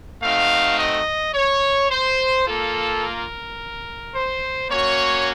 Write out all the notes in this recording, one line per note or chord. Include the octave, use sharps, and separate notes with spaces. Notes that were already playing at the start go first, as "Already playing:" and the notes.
A3 C4 D#4 F#4 F5
D#5
C#5
C5
A#3 F4 A4
A#4
C5
A#3 C#4 F#4 C#5